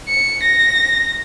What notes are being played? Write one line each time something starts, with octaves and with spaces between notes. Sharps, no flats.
C#7
A#6